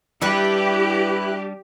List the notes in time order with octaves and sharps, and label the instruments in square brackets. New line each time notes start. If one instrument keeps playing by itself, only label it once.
[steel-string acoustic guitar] G3 D4 [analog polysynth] E4 B4 F#6 [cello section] G4